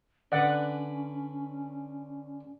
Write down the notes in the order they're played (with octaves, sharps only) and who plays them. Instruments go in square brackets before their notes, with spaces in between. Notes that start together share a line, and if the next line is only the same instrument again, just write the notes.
[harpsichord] D3 B4 [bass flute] C#4 [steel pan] D5 F#5